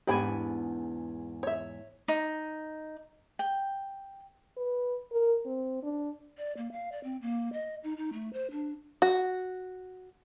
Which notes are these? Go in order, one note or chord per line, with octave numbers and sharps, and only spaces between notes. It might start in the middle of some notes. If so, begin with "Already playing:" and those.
E2 G#2 B3 D4 G4 G5 G#5 B5
C#5 E5
D#4
G5
B4
A#4
C4
D4
D5
A#3
F5
D5
C4
A#3
D#5
D#4
D#4
A3
C5
D4
F#4